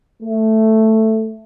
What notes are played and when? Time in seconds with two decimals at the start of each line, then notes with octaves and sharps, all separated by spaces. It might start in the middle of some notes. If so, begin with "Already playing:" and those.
0.23 A3